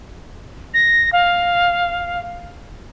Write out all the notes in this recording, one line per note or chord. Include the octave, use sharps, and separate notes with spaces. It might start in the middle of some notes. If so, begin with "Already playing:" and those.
A#6
F5